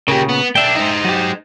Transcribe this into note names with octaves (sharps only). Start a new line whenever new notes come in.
A#2 C#3 A#3 G4
B3
B1 D4 E5 G5
D#4 C5
F#3 G4